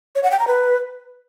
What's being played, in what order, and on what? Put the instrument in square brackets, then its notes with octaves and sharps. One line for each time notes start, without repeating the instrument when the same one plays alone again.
[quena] C#5
F#5
G5
A#5
B4